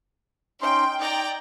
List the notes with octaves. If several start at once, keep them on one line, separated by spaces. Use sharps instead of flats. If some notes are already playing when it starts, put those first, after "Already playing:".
C#4 D#4 G5 C6
D#4 D5 G5 A#5